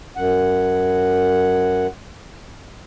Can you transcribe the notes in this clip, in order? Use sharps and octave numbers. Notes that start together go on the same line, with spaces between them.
F#2 F#5